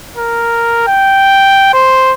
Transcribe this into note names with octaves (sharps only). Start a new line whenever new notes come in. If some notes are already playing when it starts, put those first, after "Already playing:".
A#4
G5
C5